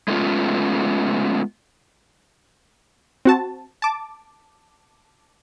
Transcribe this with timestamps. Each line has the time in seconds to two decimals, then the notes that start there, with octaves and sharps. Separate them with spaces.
0.08 G#3 A3 B3 C#4 F4
3.25 C4 F#4 A5
3.82 A5 D6